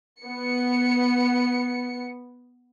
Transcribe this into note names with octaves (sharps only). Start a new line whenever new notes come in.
B3 C#7